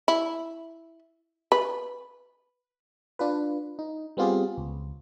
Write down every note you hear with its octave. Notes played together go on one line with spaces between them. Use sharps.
E4
B4
D4 F4 B4
D#4
G3 B3 C4 F4 G4 G#4
C#2